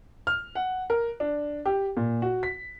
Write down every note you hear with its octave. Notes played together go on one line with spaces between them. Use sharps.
F6
F#5
A#4
D4
G4
A#2
F#4
B6